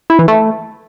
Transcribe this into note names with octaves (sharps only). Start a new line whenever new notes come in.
E4
E3
A3